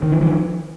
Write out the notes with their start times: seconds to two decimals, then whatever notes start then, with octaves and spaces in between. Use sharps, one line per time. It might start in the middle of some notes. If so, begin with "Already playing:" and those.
0.03 D#3
0.12 E3
0.21 D#3 F3